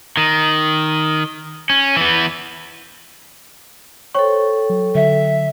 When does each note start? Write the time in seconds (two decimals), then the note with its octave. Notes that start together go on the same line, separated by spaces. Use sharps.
0.17 D#3
1.70 C#4
1.96 E3 B3
4.15 A4 C5 C#5 G5 C#6
4.70 F#3
4.95 D3 F#3 E5